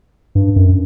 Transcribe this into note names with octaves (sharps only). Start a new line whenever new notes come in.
G2
F#2